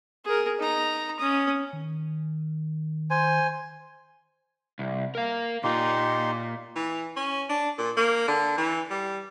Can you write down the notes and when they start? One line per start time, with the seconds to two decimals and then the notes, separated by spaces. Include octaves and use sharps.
0.25 G#4 A#4
0.59 D#4 A#5
1.19 C#4 D#6
1.73 D#3
3.10 C5 G#5
4.79 C2
5.15 A#4 F5
5.64 A#2 D#4 F4 G4 C6
6.76 E3
7.16 C#4
7.50 D4
7.78 A#2
7.97 A#3
8.28 D3
8.58 E3
8.90 G3